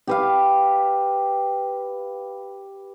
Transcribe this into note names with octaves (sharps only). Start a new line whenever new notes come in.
G4 B4 F5